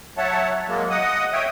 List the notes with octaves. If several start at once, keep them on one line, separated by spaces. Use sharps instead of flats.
F#3 C#5 E5 F#5 A5
F#3 G#3 A#3
D#5 F#5 D#6
C#5 E5 G5 D#6